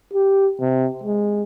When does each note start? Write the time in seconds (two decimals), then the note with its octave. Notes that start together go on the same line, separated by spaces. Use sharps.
0.13 G4
0.61 C3
1.03 G#3